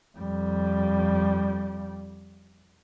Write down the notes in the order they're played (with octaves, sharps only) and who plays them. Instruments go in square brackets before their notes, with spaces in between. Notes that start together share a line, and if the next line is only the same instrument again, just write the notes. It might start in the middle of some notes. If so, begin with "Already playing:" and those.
[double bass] F2 G3